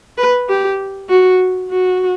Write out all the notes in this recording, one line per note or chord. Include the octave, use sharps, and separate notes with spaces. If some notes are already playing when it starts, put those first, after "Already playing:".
B4
G4
F#4
F#4